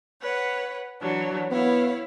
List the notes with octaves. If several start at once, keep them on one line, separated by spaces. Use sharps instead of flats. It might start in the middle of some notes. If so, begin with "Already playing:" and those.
B4 C#5 F#5
E3 F#3 D4
B3 E4 C#5 F5